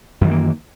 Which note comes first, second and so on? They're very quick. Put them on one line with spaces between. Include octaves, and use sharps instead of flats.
F#2 D#3 E3 A#3